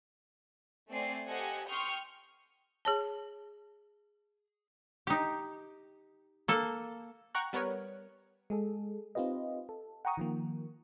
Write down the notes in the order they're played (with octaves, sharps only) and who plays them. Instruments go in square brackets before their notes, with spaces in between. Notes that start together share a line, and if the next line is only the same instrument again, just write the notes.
[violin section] A3 C4 D5 G#5 C7
G4 A4 C5 D#5 F#5 G#5
G5 C6 C#6 D#6 F6 G6
[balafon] G#4 C#5 A5
[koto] D#4 G4
A#3 A4
[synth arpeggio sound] F#5 G5 A#5 C#6 F#6
G3 B3 A#4 B4 C#5
[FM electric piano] G#3 G#4 A4
C4 D#4 F4 G4 B4 D#5
A4
F#5 G5 A#5 C#6 D#6
D#3 F3 A#3